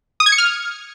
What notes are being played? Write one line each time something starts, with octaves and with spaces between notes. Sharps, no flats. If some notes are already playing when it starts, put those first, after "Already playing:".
D#6
G#6
C#7
F6